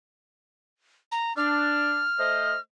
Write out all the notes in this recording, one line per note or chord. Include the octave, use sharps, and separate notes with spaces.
A#5
D4 F6
A3 C5 D#5